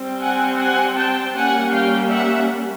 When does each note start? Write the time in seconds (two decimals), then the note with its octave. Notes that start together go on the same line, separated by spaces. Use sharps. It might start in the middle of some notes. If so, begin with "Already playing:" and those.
Already playing: G3 C4
0.20 F#5 G#5
0.58 F#5 G#5
0.96 G5 A5
1.34 G3 A#3 C#4 F#5 G#5
1.72 F5 G5
2.09 E5 F#5